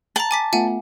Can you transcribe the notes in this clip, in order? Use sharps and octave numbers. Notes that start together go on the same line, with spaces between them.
A5 A#5 F#7
G#5 D6 B6
A3 B3 F4 E5 F#5 G#5